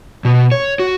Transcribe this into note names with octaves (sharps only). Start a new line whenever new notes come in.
B2
C#5
F#4